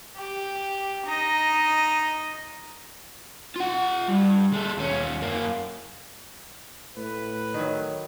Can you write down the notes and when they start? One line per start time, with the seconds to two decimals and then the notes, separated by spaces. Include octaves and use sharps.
0.17 G4
1.06 D#4 D#5
3.56 F4 F#5
4.08 G2
4.53 G#3 A4
4.77 D#2 C#4
5.21 F#2 A#3
6.97 A2 B4
7.54 D#3 F#3